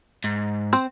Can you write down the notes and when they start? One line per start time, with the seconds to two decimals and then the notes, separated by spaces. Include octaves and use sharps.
0.24 G#2
0.73 C4 C5